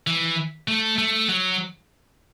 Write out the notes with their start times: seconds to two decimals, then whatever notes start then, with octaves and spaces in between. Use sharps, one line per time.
0.07 E3
0.68 A3
0.98 A3
1.29 F#3